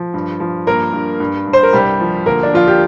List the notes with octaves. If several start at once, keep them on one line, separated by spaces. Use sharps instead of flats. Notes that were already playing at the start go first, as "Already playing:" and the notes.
Already playing: F3
G2
F3
G2 A#3 A#4
G2
G2
G2
C5
A#4
C2 G3 G4
F3
D2 A#3 A#4
D4
F3 F4
G4